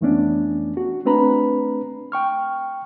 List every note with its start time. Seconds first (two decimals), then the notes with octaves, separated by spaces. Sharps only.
0.01 F2 E3 A3 B3 C#4 D4
0.77 F#4
1.05 A3 C4 D4 B4 A#5 B5
2.12 G5 C#6 F6